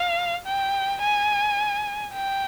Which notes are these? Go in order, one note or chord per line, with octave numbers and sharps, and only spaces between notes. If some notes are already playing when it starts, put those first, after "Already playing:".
Already playing: F5
G5
G#5
G5